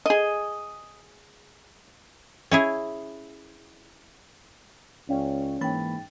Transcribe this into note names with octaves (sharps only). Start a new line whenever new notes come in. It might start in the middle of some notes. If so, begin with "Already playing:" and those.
G#4 D#5
C#4 E4 G#4
C#2 C#4 D5 F5 G5
G#2 E3 A#3 G5 B5 A6